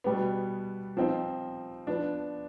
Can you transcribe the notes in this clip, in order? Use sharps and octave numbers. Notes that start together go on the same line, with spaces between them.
B2 G3 B3
F3 C4 D#4
F3 B3 D4